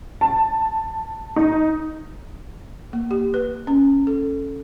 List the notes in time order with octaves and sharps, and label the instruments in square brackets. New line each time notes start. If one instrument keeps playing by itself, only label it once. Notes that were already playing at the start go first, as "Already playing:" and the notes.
[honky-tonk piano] A5
D#4
[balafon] A#3
G4
B4
C#4
A4